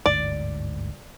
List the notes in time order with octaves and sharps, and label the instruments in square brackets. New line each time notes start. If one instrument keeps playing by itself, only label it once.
[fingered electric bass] G1 D2 G#2 [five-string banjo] D5